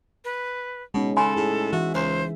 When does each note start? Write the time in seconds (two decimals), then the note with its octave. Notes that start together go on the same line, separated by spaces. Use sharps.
0.25 B4
0.94 B2 G#3 C#4 D#4
1.17 C#3 A4 G#5 B5 C6
1.36 A2 G#4
1.73 E3 F#4 E5
1.95 C#2 C5